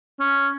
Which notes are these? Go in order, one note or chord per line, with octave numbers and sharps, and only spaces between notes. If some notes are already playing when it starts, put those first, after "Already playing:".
C#4